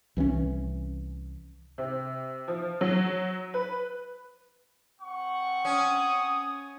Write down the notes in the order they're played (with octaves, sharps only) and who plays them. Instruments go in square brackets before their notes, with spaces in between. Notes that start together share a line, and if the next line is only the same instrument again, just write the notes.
[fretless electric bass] C2 E3 G#3 C#4
[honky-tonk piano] C3
F3
F#3
B4
[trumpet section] C4 F#5 C#6
[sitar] C#4 [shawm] D#6